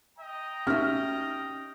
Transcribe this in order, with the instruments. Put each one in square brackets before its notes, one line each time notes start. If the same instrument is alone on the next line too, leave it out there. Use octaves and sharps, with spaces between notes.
[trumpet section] D#5 G5 A#5
[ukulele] C#4 E5 [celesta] D#4 G4 [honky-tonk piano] F6